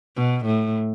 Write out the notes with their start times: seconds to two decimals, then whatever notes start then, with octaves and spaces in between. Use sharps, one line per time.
0.16 B2
0.45 A2